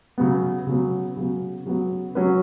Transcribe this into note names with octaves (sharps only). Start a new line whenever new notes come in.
C#3 F#3 B3
C#3 F#3 B3
C#3 F#3 B3
C#3 F#3 B3
F#3 C#4 F#4 B4